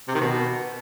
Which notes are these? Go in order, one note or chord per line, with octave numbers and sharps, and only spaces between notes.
C3
D#3
B2